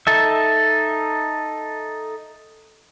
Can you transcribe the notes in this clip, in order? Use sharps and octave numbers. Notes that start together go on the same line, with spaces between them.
D#4 A4 E5